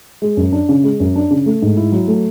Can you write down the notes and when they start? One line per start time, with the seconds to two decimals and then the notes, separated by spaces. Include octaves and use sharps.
0.22 G#3
0.37 F#2
0.52 D4
0.69 C#3
0.83 G#3
1.00 F#2
1.16 D4
1.31 C#3
1.46 A3
1.62 G#2
1.77 E4
1.92 F#3
2.08 A3